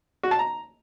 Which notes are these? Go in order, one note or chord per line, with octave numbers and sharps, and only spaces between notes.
F#4
A5
A#5